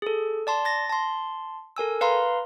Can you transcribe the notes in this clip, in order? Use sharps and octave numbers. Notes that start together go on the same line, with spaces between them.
G#4 A4
D5 A5 C6
A6 A#6
A5 C6
A4 A#4 G#5 E6
B4 F5 A#5 C6